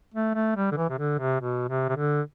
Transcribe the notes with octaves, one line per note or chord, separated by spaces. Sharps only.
A3
A3
G3
D3
E3
C3
D3
C3
B2
C3
C3
D3